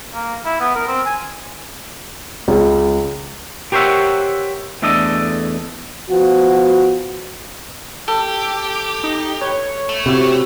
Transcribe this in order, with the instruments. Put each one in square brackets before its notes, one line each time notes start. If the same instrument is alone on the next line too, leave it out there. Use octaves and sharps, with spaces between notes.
[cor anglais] A#3
E4
B3
A#4
C4
G#5
[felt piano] C#2
[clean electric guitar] G4 A#4 C5 C#5 E5 F#5
E2 A3 D4 A4 D#5
[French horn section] F3 B3 F#4
[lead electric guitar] G4 [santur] A4
[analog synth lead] D6
D#4
[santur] B4 [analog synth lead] C#5
[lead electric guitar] A3
[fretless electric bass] C3 [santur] E4 F#4 G4